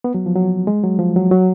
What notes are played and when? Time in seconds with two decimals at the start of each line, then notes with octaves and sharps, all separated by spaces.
0.04 B3
0.14 F#3
0.26 F3
0.35 F#3
0.67 G#3
0.83 F#3
0.99 F3
1.16 F#3
1.31 F#3